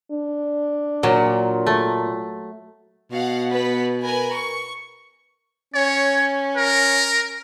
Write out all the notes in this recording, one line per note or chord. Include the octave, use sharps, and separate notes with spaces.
D4
A#2 F#3
A3
B2 F5 F#5
B3 B4 B6
A#4 B4 G#5
C#6
C#4 C#5
A#4